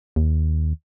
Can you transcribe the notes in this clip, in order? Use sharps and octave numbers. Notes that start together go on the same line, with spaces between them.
D#2